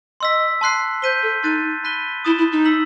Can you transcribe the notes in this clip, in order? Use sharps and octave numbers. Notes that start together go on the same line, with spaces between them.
D#5 C6 E6 B6
A5 C6 F#6 C7
C5 G6 B6 D#7 G7
A4
D#4 C6 F#6 A6 D#7
B5 F#6 B6 D#7 G7
E4 D#6 A6 E7 G7
E4
D#4
E6 B6 F#7